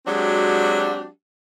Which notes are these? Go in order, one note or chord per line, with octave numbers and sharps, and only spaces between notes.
F#3 G#3 C4 D4 F#4 G4